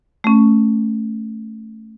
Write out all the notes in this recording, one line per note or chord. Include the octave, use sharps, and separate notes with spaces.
A3 C#4